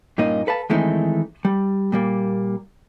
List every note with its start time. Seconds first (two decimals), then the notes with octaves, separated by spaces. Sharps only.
0.18 G2 A#2 A#3 C#4 D#4
0.47 A4 B4 F5 A5
0.70 D#3 E3 G#3 A3 C4 D#4
1.45 G3
1.92 A#2 G3 A#3